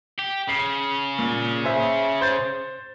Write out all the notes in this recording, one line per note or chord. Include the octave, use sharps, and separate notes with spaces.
G4
C#3 C7
A#2
G#4 C5 E5
C5 G6 A6